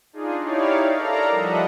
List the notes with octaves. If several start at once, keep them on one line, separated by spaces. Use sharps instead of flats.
D4 D#4 F4 G#4
D#4 E4 G4 C#5 D5 F5
A4 A#4 D5 F5 A#5
F3 G3 D#5 E5 F#5